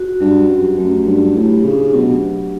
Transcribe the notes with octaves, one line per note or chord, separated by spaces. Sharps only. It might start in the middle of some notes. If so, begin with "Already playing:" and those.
Already playing: F#4
G2 F#3
F#2 G4
F#2 A3
G2 G4
A2 G4
C#3 D4
B2 F#3